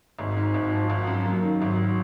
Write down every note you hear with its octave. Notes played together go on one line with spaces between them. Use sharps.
G#1 G#3
G#2
G#1
F3
G#1
F#2
F#3 A#3
D#3
G#1 F#3